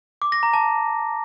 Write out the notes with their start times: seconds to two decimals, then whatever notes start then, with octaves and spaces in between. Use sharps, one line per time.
0.22 D6
0.32 A#6
0.43 A#5
0.53 A5